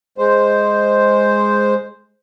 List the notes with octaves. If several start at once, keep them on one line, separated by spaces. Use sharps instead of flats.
G#3 C5